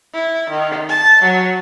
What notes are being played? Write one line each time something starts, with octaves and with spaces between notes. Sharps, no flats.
E4
D#3
A5
F#3